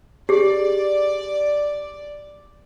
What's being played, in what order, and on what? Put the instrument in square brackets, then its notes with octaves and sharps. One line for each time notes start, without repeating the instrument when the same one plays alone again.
[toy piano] G4 G#4 [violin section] D5